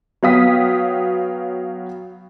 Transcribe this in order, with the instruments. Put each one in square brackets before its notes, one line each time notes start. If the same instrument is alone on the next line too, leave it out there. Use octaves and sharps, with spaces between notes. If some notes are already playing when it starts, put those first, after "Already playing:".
[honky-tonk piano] F#3 B3 F5 G5 D#6 B6